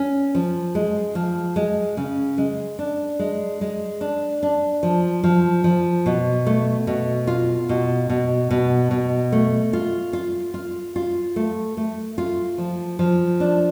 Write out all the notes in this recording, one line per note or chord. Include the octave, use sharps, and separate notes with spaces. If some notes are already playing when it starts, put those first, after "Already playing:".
Already playing: C#4
F3
G#3
F3
G#3
C#3
G#3
D4
G#3
G#3
D4
D4
F3
F3
F3
B2
A3
B2
F4
B2
B2
B2
B2
A3
F4
F4
F4
F4
A3
A3
F4
F3
F3
D4